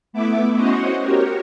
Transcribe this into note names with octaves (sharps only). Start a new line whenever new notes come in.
A3 B3 E4 E5 D6
C#4 F#4 C5 C#5 D#5 F#5
F#4 G4 A#4 C#5